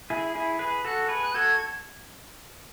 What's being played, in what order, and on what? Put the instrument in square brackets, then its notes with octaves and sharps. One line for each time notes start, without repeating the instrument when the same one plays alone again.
[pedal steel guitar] E4 G#4
E4 G#4
G#4 B4
[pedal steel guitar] F#4 A4 [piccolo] F#6
[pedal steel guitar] G#4 B4
[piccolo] F#6
[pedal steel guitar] F#4 A4 [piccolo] G#6